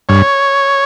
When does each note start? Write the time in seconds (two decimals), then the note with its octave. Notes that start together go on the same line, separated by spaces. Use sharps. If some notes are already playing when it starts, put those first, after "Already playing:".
0.09 G2 C#5